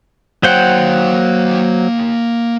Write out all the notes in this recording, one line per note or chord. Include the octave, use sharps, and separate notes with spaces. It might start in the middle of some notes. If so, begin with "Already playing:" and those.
F#3 A#3 C5 F#5 G5